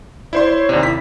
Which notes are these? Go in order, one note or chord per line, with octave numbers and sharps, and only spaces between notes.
E4 C5 D5 C6
C#5
D#2 C3 D5
E4 B6